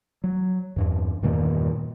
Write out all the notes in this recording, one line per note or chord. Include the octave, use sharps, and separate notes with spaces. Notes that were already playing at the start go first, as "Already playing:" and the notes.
F#3
E2 G2
E2 G2 A#2 D#3